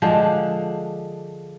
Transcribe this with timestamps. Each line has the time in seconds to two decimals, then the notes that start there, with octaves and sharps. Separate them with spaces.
0.02 D3 F3 G#3 D4